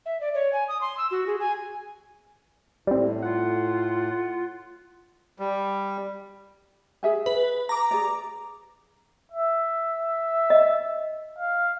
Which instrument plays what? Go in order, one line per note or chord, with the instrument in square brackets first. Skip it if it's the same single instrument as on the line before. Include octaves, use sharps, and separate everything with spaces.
[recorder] E5
D5
C#5
G#5
D#6
C6
E6
F#4
G#4
G#5
[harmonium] A2 [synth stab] G3 C4
[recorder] F4 [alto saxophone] F#5
[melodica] G3
[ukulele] G#4 E5 G#5
[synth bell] B4
A#5 D6
[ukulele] G#4 D5
[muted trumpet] E5
[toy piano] D#5
[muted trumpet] F5